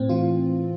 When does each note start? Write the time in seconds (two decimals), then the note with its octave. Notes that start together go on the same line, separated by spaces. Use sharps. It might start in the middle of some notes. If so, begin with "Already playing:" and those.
Already playing: A2 C4
0.09 E3 F4